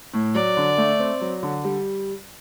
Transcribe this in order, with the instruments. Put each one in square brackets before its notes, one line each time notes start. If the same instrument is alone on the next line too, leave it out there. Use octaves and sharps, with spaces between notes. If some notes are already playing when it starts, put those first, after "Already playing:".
[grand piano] A2
[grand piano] F#3 [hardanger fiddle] D5
[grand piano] D3
A3
C4
F#3
D3
G3